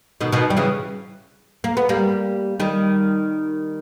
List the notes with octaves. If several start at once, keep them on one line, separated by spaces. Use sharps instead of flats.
B2 D#3
B2 D#3
G3
C#3 E3
A#3
B3
G3 A#3
D#3 G3